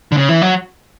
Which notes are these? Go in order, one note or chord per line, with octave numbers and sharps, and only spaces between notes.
D3
C#3
E3
F#3